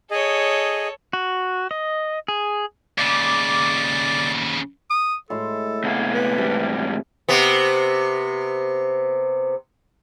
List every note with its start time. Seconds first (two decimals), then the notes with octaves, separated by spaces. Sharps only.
0.11 G#4 A4 C#5 D#5
1.13 F#4
1.71 D#5
2.28 G#4
2.98 D#2 C#3 D5 D6
4.90 D#6
5.30 A2 G#3 A4 C6
5.84 C3 B3 F5
6.15 B4
6.38 E2 G#2 C3 G3
7.29 C3 B3